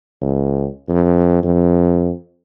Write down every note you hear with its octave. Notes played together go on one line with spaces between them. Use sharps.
C#2
F2
F2